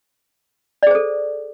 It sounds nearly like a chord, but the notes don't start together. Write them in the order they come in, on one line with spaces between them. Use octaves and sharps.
D5 G#4 C5 A4